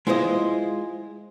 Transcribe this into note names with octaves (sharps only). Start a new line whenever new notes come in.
G#3 E4 F4 C5 D#5